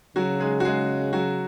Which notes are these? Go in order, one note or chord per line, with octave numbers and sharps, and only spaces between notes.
C#3 F#3 F#4
G#3 G#4
F#4
G#3 G#4
F#3 F#4